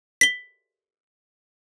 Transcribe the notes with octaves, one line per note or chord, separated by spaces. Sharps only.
B6 G7